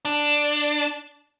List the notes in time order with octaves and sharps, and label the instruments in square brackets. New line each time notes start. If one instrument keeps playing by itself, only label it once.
[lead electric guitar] D4